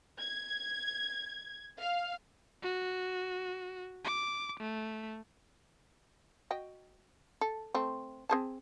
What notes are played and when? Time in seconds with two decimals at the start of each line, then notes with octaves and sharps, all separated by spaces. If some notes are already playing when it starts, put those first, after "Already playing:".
0.19 G#6
1.80 F5
2.63 F#4
4.05 D6
4.60 A3
6.51 F#4 D#5 G5
7.41 A4
7.74 A3 C4
8.29 C4 G#4 A5